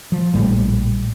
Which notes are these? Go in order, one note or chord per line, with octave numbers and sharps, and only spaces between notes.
F3
A#1 A2 G3